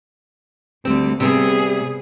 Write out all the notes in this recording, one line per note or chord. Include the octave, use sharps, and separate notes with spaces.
D2 D3 G3 C4
C3 G3 B3 G#4